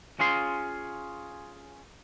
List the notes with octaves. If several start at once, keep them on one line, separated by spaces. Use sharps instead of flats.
C#4 F4 G#4 C6